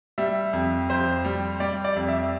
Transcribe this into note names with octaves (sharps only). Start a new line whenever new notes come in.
G3 E5
F2
F2 C5
G3
G3 D5
D5
F2
E5